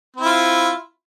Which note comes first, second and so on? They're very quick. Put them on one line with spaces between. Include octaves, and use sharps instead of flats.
C4 E4 F4